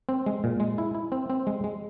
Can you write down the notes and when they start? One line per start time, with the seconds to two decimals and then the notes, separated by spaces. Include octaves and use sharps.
0.09 C4
0.26 G#3
0.44 A#2
0.60 G#3
0.78 E4
0.95 E4
1.12 C4
1.30 C4
1.47 G#3
1.64 G#3